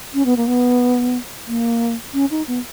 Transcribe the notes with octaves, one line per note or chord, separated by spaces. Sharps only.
C#4
B3
A#3
B3
A#3
C#4
D#4
B3